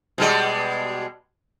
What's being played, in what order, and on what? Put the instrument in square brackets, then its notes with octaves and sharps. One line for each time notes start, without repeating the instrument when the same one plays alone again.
[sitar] B2 G3 G#3